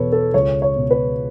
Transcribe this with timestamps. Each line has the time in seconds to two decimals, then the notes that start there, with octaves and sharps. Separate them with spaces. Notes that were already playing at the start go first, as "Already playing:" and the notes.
Already playing: E2 B2 A4 B4 C#5
0.12 A4
0.34 C#2 C#5
0.62 C#5
0.76 B2
0.91 B4